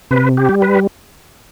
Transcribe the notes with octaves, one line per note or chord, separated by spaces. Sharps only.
C3 B4
G4
G3
B4